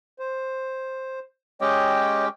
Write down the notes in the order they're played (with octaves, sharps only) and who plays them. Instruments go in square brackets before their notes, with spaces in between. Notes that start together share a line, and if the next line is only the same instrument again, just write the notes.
[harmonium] C5
[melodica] G#3 C#4 G4 [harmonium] C#5 D#5 G5